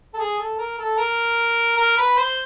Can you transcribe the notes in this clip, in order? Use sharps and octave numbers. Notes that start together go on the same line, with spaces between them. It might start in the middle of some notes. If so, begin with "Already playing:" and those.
A4
G#4
A4
A#4
A4
A#4
A#4
B4
C5